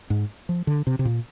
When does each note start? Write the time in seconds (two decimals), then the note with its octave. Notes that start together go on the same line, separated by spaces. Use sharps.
0.10 G#2
0.49 F3
0.67 D3
0.87 C3
0.99 C3
1.05 A#2